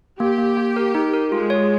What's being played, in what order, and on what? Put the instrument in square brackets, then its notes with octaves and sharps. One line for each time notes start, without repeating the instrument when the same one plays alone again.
[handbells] A#3 [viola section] G4
[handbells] A#3
A#3
A#4
D#4
A#4
[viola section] G#3 [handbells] F4
[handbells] C#5